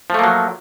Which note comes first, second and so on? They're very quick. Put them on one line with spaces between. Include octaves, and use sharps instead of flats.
F3 A3 A#3 F#3